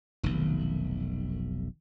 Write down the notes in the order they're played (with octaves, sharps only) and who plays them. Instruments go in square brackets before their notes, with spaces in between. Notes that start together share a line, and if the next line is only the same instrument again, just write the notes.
[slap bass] F1 B1 [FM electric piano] D#3